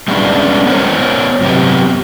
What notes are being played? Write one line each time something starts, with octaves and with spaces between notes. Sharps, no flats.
G3 G#3 B3 C#4 D4
B3 A#4 C5 C#5
F#2 C3 B3 G4